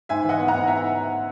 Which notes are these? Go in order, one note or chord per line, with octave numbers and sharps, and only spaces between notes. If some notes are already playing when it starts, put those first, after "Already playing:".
G#2 E5 G#5
E3
D#5 F#5
B3
F#5 A#5
G#2
E4 E5 G#5